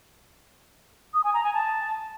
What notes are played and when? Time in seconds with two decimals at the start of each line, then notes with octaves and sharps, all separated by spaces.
1.13 D#6
1.23 G#5
1.33 A#5
1.43 G#5
1.53 A5